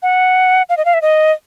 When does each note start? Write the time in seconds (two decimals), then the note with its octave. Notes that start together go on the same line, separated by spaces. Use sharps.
0.03 F#5
0.69 F5
0.77 D#5
0.85 F5
0.94 E5
1.02 D#5